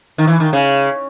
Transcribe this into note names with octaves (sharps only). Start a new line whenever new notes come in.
D#3
E3
D#3
C#3